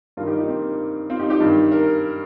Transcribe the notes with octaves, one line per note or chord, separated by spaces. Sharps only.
G2 D#3 F4 A#4
D#4 G4
A#3 D#4
C4
C4 F4
D#4 G4
D#4 G4
G2 D#3
A#4